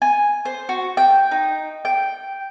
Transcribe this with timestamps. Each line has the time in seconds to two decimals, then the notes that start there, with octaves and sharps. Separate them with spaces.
0.02 G#5
0.45 C5
0.69 F#4
0.97 G5
1.31 D#4
1.85 G5